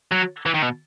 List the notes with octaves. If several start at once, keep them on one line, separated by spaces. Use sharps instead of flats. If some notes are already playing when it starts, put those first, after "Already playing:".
F#3
E3
D#3
B2